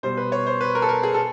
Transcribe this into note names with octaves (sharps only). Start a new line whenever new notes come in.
B2 G3 C5
B4
C#5
C5
B4
A#4
A4
A#4
G#4
A4